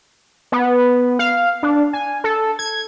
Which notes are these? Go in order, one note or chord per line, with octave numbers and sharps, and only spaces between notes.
B3
F5
D4
G#5
A4
G#6